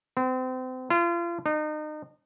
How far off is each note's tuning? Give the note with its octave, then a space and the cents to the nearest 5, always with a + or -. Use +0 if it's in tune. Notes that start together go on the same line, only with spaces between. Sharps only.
C4 -35
F4 -35
D#4 -35